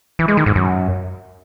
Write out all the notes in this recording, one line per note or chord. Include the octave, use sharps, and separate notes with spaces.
E3
G#3
D#3
G#2
F#2